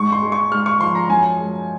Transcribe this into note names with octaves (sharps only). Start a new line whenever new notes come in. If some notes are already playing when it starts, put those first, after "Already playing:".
Already playing: G#2 G#3 C#6
C6
G#3
C#6
G#2 F6
C#6
F3 C6
A#5
F#2 G#5
G#3